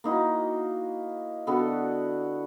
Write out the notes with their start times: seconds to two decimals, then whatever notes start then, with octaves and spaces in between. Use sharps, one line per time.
0.04 A#3 D#4 E4 F#4
1.47 D3 B3 F#4 A4